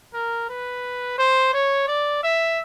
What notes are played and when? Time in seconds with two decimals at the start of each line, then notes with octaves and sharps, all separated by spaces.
0.14 A#4
0.49 B4
1.18 C5
1.54 C#5
1.88 D5
2.23 E5